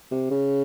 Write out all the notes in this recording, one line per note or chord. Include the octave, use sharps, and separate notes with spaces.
C3
C#3